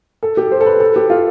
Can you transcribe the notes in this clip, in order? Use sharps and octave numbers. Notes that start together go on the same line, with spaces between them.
A4
G4
C5
A4
B4
A4
G4
F4